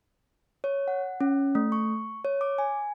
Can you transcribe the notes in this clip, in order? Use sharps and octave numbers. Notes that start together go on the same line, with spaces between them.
C#5
F#5
C#4
A3
C#6
C#5
D6
G#5